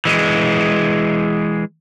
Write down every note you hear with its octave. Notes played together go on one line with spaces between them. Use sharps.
E3 G#3